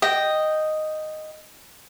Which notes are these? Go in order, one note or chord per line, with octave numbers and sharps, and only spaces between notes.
D#5 G5